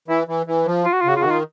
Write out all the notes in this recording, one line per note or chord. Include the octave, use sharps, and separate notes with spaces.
E3 E4
E3
E3
F3
F4
F#4
F4
C#3 F#4
F4
D#3 F#4
F4